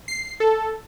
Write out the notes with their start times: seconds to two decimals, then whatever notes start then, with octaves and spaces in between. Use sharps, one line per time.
0.08 C7
0.40 A4